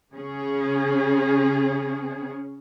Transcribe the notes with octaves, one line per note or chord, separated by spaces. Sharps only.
C#3 C#4 G#4